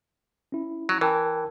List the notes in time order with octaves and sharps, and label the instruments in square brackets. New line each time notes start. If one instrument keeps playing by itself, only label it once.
[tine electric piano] C#4 E4
[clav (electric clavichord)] F#3
[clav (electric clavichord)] E3 [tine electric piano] A#4 G5 A5